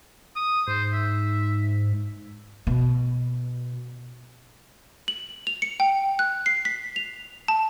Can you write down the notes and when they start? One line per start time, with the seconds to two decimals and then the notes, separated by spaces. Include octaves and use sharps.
0.36 D#6
0.68 G#2 C5
0.93 E5
2.67 B2
5.08 F#7
5.47 F7
5.62 C#7
5.80 G5
6.19 F#6
6.46 C7
6.65 B6
6.96 F7
7.48 A5